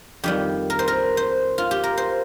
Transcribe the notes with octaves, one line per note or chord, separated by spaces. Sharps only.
F2 D#3 G3 G4
A#4
C5
A#4
C5
F4
G4
A#4
C5